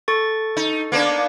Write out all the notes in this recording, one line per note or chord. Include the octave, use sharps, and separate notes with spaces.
A4 C#6 A6
D#4
A#3 B3 D4